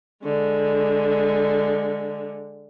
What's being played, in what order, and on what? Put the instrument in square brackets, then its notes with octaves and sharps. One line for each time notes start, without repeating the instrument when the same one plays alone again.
[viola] D3 G#3